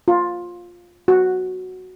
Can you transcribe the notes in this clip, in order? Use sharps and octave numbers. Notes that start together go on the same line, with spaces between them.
F4
F#4